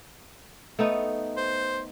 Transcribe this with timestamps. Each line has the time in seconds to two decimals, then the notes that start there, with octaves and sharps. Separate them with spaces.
0.79 A3 B3 D#4
1.37 C5